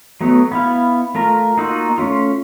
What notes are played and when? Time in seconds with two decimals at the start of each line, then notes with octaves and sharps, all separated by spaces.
0.21 F#3 A3 B3
0.52 B3 E4 F5
1.15 A3 F4 A#4 A#5
1.57 A#3 D#4 F4 F#4 E6
1.98 A3 C#4 F4